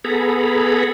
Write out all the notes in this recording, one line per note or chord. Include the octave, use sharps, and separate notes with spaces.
B3 G#4 A4 A#5 B5